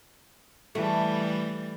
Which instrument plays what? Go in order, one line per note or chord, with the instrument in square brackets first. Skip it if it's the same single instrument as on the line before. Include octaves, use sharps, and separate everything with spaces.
[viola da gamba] E3 G3 [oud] A3